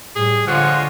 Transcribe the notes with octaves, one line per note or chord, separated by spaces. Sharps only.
A2 G3 G#4
D3 F3 G#3 F4 C#5 F#5